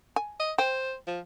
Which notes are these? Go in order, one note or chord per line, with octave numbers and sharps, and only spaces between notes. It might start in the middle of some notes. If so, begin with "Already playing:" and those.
G#5
D#5
C5 G5
F3